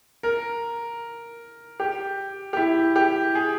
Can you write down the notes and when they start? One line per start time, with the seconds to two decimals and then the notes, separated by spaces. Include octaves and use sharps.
0.23 A#4
1.80 G4
2.53 G4
2.57 E4
2.96 G4
3.35 G#4